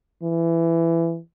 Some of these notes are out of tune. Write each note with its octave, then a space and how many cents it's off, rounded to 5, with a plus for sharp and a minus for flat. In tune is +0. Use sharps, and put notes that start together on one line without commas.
E3 +15